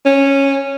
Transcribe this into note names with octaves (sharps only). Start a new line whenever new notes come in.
C#4